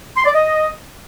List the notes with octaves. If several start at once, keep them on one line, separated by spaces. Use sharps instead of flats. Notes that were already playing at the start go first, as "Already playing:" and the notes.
C6
D5
D#5